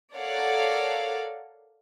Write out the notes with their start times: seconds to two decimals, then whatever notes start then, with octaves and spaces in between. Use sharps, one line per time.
0.15 A4 A#4 C#5 D5 F5 F#5